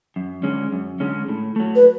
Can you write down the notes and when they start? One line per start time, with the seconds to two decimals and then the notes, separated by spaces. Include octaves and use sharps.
0.16 F#2
0.43 D3 G#3 C#4
0.73 F#2
1.00 D3 G#3 C#4
1.28 A2
1.56 F#3 A3
1.76 B4